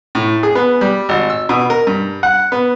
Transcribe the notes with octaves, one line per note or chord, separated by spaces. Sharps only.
A2
G#4
B3
G3
G#1
E6
B2
A#4
G2
F#5
B3